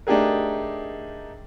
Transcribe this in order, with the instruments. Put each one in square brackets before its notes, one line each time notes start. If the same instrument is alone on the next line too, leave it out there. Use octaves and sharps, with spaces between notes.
[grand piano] A3 D4 D#4 G4 G#4 A#4